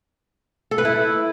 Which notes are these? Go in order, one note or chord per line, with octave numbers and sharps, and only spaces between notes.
A4
B4
E4